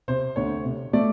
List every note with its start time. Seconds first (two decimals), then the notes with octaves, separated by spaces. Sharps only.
0.08 C3 C5
0.36 D2 C#5
0.65 C3
0.93 A3 D5